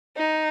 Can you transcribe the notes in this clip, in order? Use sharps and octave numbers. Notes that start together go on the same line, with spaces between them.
D#4